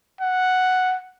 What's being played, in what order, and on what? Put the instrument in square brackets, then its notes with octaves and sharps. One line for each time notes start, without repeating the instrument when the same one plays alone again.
[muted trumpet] F#5